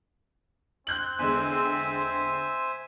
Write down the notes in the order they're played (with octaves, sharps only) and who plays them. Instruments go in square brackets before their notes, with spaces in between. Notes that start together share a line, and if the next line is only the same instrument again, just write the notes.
[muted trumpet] C4 [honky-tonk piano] F#6 G6 F#7
[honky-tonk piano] E2 D3 G#3 [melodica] C5 E5 G#5